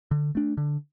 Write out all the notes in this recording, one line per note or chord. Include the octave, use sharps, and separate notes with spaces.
D3
A3 D4
D3